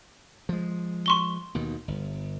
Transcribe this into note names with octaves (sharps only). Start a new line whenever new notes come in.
F3 G#3
C6 C#6 G7
D#2 B2 D#3
G1